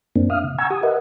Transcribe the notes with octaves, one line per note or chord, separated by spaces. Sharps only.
F#2 A#3 C4 D4
E5 F5 D#6 F6
C#3
F#5 G#5 A#5 C#6 E6 G#6
G4 D#6
A#4 B4 D#5 E5 F#5